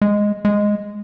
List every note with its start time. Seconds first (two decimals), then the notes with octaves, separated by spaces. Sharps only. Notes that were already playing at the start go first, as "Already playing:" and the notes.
0.01 G#3
0.45 G#3